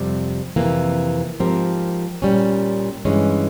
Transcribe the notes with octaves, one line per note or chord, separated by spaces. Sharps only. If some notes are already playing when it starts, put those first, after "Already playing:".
Already playing: F2 C3 G3
F2 C3 E3 A#3
G#2 F3 C4 G4 A#4
A#2 G3 C#4
G2 E3 G#3 C#4